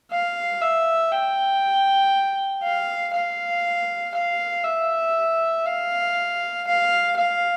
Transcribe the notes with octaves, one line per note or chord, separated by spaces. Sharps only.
F5
E5
G5
F5
F5
F5
E5
F5
F5
F5